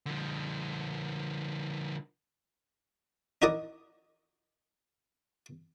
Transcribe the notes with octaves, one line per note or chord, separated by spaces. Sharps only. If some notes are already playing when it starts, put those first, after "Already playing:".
D3 F3
D#4 E4 F#4 A#4 D5 D#5